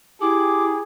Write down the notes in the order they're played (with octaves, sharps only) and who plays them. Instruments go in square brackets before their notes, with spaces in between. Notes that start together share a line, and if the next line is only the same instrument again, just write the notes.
[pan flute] E4 [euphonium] G4 [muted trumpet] G#4 [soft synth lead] D6